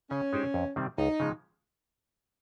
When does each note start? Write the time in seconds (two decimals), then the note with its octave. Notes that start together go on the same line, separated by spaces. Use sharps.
0.10 C#3 C#4
0.33 G#3 D#4 G4 C5
0.54 F2
0.76 C3 D#3 G3 C4
0.98 C#2 D#4
1.20 C#3 F3 G#3